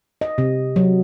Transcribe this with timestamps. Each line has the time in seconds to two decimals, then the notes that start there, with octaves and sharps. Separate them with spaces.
0.21 D#5
0.38 C3
0.76 F#3